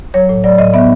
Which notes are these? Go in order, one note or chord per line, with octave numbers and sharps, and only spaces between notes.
F#3 C#5
A2
F#3 D5
A2 D#5
B3 E5